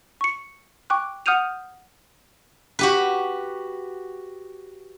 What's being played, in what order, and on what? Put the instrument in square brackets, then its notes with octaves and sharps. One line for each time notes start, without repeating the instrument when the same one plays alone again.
[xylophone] C#6 C#7
G5 C#6 D6 F#6
F#5 D#6 F6 G6 D#7 F7
[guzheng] F#4 G4 B4